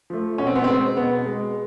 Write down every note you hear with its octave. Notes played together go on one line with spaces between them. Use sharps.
F3 A3
B2 C#4
C4
B3
G#3 C4
B2 B3
G#3